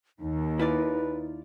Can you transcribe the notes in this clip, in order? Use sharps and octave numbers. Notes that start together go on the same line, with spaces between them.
D#2 D#4
E4 F4 B4 D5